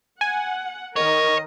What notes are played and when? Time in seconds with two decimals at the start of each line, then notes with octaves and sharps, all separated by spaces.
0.21 F#5 G#5
0.96 D#3 A#4 C#5 D#5